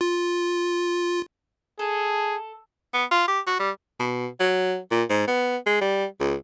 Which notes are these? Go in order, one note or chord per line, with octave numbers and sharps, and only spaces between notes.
F4
G#4 A4
B3
F4
G4
F#4
G3
B2
F#3
A#2
G#2
B3
G#3
G3
C#2